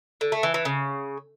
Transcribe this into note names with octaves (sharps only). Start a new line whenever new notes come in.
D3
A3
E3
E3
C#3